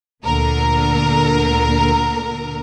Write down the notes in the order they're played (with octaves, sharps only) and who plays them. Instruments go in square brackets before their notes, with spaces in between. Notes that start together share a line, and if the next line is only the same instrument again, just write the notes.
[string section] D2 A#2 D3 A#4